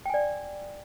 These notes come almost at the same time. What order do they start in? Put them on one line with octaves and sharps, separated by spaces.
G5 G#5 D5